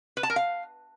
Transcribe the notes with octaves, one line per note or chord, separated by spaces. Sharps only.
B4
A5
A#4
F5